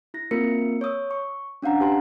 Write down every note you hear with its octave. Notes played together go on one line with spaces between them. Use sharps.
E4 A#6
A#3 C4 F4 A#4 C#7
C#5 C#6 D#6 E6
C#6
C#4 D4 F5 F#5 A#5
G4 B4 G#5 A5 C6